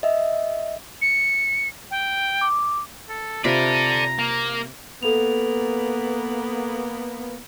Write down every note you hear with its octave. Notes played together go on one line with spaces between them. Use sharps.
D#5 E5
C#7
G5
D6
A4
C3 F4 A4 D5 A#5 B5
A#3
A#3 B3 A4 F7